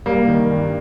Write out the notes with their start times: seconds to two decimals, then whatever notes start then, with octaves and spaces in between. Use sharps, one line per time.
0.06 G3 A#3
0.28 D#3
0.51 G2